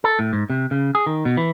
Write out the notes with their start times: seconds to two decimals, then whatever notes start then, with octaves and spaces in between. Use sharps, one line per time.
0.04 A4
0.19 A2
0.33 G#2
0.50 C3
0.71 C#3
0.95 G#4
1.06 D#3
1.25 B2
1.37 E3